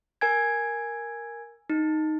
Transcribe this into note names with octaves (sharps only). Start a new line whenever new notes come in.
A#4 G#5 G#6
D#4